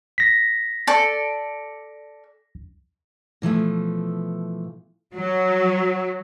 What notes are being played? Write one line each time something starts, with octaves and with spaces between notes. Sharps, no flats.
A#6 B6
A4 D5
B2 E3 F3 A3
F#3